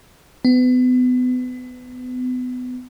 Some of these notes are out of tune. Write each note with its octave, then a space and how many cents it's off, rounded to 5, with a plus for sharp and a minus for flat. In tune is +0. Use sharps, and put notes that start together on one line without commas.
B3 +30